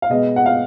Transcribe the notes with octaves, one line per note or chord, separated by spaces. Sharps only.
F5
B2 G#3 B3 D#5
F#5
F5